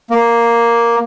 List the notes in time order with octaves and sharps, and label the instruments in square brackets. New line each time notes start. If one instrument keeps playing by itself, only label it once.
[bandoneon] A#3